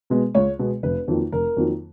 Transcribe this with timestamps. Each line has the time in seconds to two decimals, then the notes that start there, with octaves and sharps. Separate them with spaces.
0.10 B2 G#3 B3
0.35 C#2 C#5
0.59 B2 G#3 B3
0.83 F1 B4
1.08 F2 D#3 F#3 A#3
1.32 F1 A#4
1.57 F2 D#3 F#3 A#3